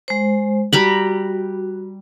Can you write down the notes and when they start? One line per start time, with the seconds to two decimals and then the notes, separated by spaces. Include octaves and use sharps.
0.08 G#3 C5
0.73 G3 F#4 A#5 B5